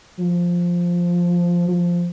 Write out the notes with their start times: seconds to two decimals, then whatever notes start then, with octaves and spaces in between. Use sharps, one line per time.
0.19 F3
1.69 F3